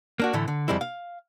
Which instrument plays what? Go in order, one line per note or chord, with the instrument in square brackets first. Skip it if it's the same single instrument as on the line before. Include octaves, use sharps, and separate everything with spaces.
[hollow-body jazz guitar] A#3 D4 F#4
A2 D3 E3 A3
D3
F2 C3 G3 G#3 E4
F5